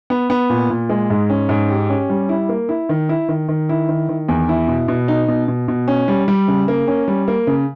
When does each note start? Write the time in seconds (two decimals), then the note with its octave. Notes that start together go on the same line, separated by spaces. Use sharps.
0.10 B3
0.30 B3
0.50 A#2
0.70 A#2
0.89 G#3
1.10 G#2
1.30 C#4
1.49 G#2
1.69 G4
1.89 C#4
2.10 G3
2.29 E4
2.49 A#3
2.69 E4
2.89 D#3
3.09 E4
3.29 D#3
3.49 D#3
3.69 E4
3.89 D#3
4.09 D#3
4.29 E2
4.49 E4
4.68 B2
4.88 B2
5.08 D#4
5.28 B2
5.48 B2
5.68 B2
5.88 C#4
6.08 G3
6.28 G3
6.48 C#3
6.68 A#3
6.88 C#4
7.08 G3
7.28 A#3
7.47 C#3